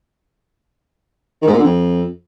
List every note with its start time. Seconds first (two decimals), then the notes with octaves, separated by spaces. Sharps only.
1.42 D#3
1.47 G#2
1.53 A#2
1.58 D3
1.63 F2